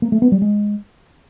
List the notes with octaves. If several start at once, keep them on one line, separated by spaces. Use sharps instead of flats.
A#3
A3
B3
G3
G#3